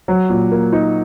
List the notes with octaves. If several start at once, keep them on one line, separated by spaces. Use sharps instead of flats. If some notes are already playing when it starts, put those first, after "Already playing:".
F#3
A#2
A#3
D#4